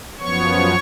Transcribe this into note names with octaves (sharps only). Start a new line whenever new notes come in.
F#2 F3 B3 C#5 C#6